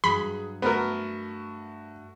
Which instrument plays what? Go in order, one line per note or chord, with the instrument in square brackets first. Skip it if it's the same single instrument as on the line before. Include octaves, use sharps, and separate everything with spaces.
[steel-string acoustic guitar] G2 F#3 [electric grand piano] G#4 [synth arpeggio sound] B5
[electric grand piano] A3 F#4 [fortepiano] B3 A#4